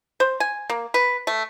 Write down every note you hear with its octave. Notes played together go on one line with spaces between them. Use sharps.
C5
G#5
A#3
B4
A3